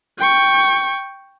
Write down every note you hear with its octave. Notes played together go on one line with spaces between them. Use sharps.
G5 C#6